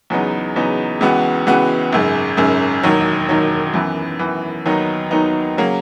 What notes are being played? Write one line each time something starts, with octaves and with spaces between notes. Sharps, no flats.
E2 C#3 F#3 B3 D#4
E2 C#3 F#3 B3 D#4
C#2 C#3 E3 B3 F#4
C#2 C#3 E3 B3 F#4
G#1 F#2 C#3
G#1 F#2 C#3
E1 D#2 D#3 F#3
E1 D#2 D#3 F#3
F#2 E3 B3
F#2 E3 B3
D#2 D#3 F#3 B3 D#4
D#2 D#3 F#3 B3 D#4
C#3 F#3 A#3